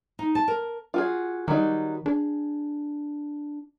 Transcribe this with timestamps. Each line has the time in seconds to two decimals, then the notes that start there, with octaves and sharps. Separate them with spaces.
0.19 D#4
0.35 A5
0.48 A#4
0.94 F4 F#4 G#4
1.48 D#3 F#3 G3 D#4
2.06 D4 G#4